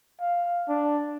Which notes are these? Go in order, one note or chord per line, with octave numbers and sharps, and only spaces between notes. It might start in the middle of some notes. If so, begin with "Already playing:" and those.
F5
D4